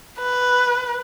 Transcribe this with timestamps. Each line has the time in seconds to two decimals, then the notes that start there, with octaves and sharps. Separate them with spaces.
0.19 B4